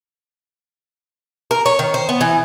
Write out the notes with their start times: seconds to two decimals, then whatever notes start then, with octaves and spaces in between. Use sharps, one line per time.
1.51 A#4
1.66 C#5
1.79 D#3
1.94 C5
2.09 B3
2.21 E3